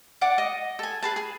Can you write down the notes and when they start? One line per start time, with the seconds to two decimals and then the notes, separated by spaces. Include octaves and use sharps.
0.21 D5 F#5 D6
0.38 D#5
0.79 A4 G#5
1.03 G#4 B4 A5
1.16 G#4